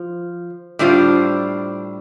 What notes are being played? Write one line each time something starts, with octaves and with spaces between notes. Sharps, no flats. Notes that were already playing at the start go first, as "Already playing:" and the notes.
Already playing: F3
A2 G3 D4 F4 C5